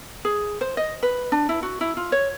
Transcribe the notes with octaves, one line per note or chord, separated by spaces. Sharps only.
G#4
C5
D#5
B4
D4
E4
F#4
E4
F4
C#5